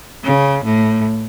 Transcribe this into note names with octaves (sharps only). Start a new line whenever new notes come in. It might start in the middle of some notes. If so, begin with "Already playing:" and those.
C#3
A2